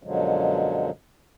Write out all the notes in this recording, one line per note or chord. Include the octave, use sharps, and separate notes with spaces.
F#2 B2 D3 F3 F#3 G#3